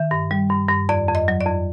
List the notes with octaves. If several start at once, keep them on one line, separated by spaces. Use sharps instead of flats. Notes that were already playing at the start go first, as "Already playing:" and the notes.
Already playing: D#3 E5
G2
G3
G2
G2
F2 D5
F2
D#5
F#3
D5
F2